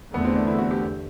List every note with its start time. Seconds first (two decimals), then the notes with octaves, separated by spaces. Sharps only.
0.14 E2 D3 A3 B3
0.25 C4
0.36 D4
0.47 E4
0.58 F#4
0.71 G4